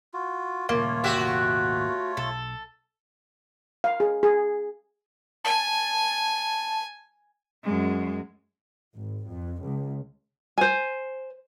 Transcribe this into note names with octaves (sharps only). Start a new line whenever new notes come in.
F4 F#4
D#1 A#2 C#3 A3 A#3 F4 C#5
D#1 G#1 C3 F#4 G4 E5
B1 A4
F5
G#4
G#4
G#5 A5
F#2 G#3
G#1
F2
C#2
C5 G#5